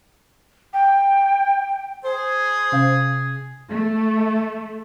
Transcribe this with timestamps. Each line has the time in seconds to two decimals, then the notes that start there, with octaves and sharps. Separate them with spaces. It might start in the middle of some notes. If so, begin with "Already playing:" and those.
0.74 G5
2.05 G#4 C5
2.72 C3 C#4 F5
3.70 A3